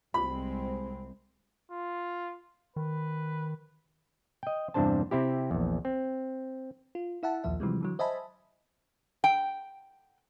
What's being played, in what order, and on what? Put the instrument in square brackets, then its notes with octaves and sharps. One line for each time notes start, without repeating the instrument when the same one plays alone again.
[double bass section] C2 G#3 C4 [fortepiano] B5
[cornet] F4
[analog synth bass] D#3 [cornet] B4
[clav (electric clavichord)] D#5 G5
E2 G2 C3 D4 C5 A5
C3 C4 E4 G4
A#1 E2
C4
[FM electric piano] F4
E4 E5 F#5 A5
A#1 D#2 F3 E5
C3 E3 F3 G3 G#3
D3 E3 F#3
C5 D#5 E5 G#5 A5 B5
[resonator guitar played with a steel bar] G5